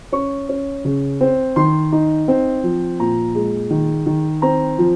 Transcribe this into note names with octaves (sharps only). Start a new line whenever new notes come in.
C#4 C#6
C#4
C#3
C4
D#3 C6
D#4
C4
F3
A#2 A#5
G#3
D#3
D#3
C4 A#5
F3